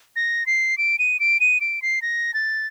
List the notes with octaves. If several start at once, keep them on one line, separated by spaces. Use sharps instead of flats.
A#6
C7
D7
D#7
D7
D#7
D7
C7
A#6
A6